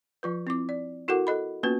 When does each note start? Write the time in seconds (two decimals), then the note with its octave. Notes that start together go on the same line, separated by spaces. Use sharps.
0.23 F3 F4 B4
0.47 C4 E4 D6
0.69 D5
1.08 E4 F#4 A4 A#4 F#5 D6
1.27 A4 D#5 B5
1.63 A#3 B3 C#4 F4 F#4 B4